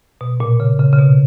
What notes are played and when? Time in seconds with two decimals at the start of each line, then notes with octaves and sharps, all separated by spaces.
0.21 B2
0.40 A#2
0.60 C#3
0.79 C#3
0.93 C#3
0.99 B2